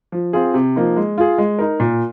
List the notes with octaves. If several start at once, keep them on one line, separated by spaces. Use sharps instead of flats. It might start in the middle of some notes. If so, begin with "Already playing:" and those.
F3
C4 F4 G#4
C3
F3 A#3 D#4
G#3
F4 G#4
G#3
D#4 A#4
A#2